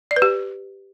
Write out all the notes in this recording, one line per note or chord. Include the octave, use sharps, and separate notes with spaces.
D5
B4
G4